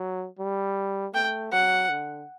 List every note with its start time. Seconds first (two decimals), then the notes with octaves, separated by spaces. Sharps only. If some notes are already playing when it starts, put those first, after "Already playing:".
Already playing: F#3
0.39 G3
1.14 A3 G5
1.52 F#3 F#5
1.90 D3